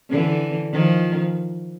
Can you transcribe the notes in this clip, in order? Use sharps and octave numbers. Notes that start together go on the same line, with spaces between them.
D3 E3
D#3 F3